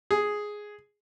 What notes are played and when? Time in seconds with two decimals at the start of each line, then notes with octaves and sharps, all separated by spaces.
0.11 G#4